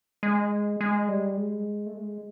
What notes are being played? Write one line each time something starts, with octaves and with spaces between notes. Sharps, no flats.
G#3
G#3
G3
G#3
A3
G#3